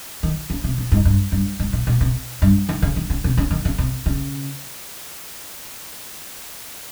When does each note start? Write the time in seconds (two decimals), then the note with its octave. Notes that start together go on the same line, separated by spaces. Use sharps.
0.23 D#3
0.50 C#3
0.64 C3
0.78 A#2
0.92 G#2
1.05 G2
1.32 G2
1.60 G#2
1.73 A#2
1.87 A#2
2.01 C3
2.42 G2
2.69 D#3
2.82 C#3
2.96 D#3
3.10 C#3
3.24 C3
3.37 C#3
3.51 D#3
3.65 C#3
3.78 C3
4.06 C#3